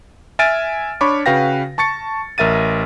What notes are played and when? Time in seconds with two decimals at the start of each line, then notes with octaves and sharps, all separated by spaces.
0.39 E5 G#5 F6 A6 D7 D#7
1.01 D4 C#5 B5 C#6 D6
1.26 C#3 F#4 B4 F5 G5 A#6
1.78 A5 C#6 A6 C#7
2.38 A1 A#4 E5 A6 D#7